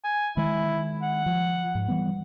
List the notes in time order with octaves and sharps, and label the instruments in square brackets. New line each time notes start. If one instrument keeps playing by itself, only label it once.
[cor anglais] G#5
[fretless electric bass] D#3 G#3 [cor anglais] E4
[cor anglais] F#5
[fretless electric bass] F3
G#2
E3 G3 B3